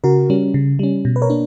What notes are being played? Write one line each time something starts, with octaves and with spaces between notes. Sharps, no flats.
C#3 F#4 A#4
G3 C#4
C#3
G3 C#4
B2
B4
A#4 C#5
A#3 D4